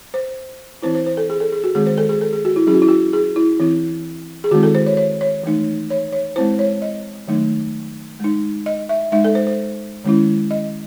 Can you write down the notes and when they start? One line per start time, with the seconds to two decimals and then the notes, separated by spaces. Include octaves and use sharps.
0.14 C5
0.82 E3 C4 E4 C5
0.95 C5
1.06 C5
1.17 A4
1.30 G#4
1.40 A4
1.52 G#4
1.64 F#4
1.75 D#3 G#3 C4 G#4
1.86 C5
1.98 A4
2.09 G#4
2.21 A4
2.33 G#4
2.45 F#4
2.56 E4
2.67 F#3 C#4 E4 G#4
2.74 F#4
2.82 E4
2.88 F#4
3.13 G#4
3.36 E4
3.60 E3 C4 E4
4.44 G#4
4.51 D#3 G#3 C4 E4 F#4
4.63 A4
4.75 C5
4.86 C#5
4.97 C#5
5.21 C#5
5.44 E3 A3 D#4
5.90 C#5
6.13 C#5
6.36 G#3 C4 E4 C5
6.59 C#5
6.82 D#5
7.28 D#3 F#3 A3 D#4
8.20 G#3 D#4
8.66 D#5
8.89 E5
9.12 G#3 D#4 E5
9.24 A4
9.35 C5
9.47 C5
10.05 D#3 G#3 C#4 E4
10.51 D#5